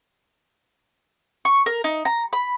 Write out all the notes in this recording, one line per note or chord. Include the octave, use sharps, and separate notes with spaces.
C#6
A#4
D#4
A#5
B5